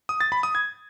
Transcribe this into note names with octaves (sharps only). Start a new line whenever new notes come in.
D#6
A6
B5
D#6
G#6